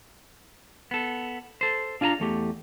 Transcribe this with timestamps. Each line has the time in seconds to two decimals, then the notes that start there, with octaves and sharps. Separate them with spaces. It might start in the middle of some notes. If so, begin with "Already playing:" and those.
0.91 B3 A4
1.61 A4 C5
2.01 D4 F4 G#4 G#5 A#5
2.20 E2 A3 G4